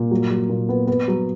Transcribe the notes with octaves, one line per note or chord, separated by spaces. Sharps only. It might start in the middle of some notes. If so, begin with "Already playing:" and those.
Already playing: A#2
F#3
F#3
A#2
B3
B3
F#3